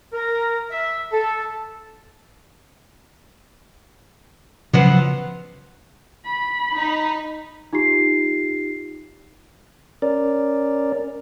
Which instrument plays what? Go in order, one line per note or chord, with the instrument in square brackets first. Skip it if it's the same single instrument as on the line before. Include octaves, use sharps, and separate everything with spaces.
[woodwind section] A#4
E5
A4
[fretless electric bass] C#3 [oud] F3 F#3 B3
[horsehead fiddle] B5
[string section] D#4
[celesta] D#4 F4 G4 C7
[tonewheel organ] C#4 A#4 D5